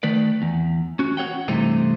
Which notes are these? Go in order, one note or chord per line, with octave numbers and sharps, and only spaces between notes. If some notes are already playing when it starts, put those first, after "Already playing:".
D#3 A3 B4 D5
E2
C#4 F#4
F#4 A4 C#5 F#5 G5
G2 C3 E3 A3 C4 D#4